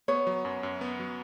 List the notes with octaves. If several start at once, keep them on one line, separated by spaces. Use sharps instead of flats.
B3 C#5
F#3
F#2
F#2
B3
F#3